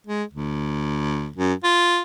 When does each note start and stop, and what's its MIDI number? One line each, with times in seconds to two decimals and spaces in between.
0.07 0.24 56
0.33 1.31 38
1.36 1.54 42
1.64 2.02 65